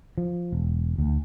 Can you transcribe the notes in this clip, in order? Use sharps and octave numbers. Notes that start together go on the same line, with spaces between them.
F3
E1
D2